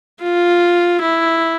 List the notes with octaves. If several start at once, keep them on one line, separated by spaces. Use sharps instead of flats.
F4
E4